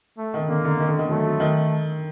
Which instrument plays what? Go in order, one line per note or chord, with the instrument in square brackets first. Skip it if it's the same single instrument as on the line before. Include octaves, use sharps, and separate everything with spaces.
[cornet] A3
[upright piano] D#3
[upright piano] D3 [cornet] A#3
[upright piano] D3
D#3
D3
D#3
[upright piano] F#3 [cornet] A3
[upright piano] F#3
D#3